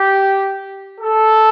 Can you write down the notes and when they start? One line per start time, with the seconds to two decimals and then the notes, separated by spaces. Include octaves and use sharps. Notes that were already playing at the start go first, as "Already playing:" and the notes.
Already playing: G4
0.99 A4